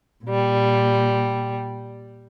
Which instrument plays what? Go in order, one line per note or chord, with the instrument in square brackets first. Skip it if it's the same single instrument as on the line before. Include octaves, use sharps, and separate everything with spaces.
[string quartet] A#2 G3